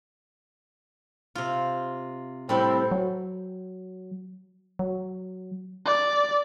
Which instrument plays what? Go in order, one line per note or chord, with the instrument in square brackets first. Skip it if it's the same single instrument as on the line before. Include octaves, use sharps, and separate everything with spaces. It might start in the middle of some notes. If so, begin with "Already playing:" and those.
[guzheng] C3 F4
[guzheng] A2 G3 E4 [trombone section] C4
[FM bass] F#3
F#3
[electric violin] D5